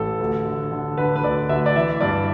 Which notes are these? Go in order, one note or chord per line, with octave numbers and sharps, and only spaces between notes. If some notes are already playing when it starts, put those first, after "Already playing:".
Already playing: A1 A4
D2
D3
D3
D3 B4
B4
D2 D5
D2 E5
D5
E3 E5
G2 D5